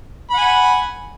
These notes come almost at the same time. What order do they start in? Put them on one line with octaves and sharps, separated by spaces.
B5 F#5 G#5